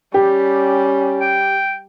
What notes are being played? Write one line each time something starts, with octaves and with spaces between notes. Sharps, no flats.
G3 C#4 G4
G5